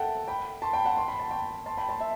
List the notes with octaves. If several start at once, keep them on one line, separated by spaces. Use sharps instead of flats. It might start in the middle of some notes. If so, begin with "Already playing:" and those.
Already playing: A4 E5 F#5 G5 A5
G5 B5
A5 C6
G5 B5
F#5 A5
C6
B5
A5
G5 B5
A5 C6
G5 B5
A5 C6
E5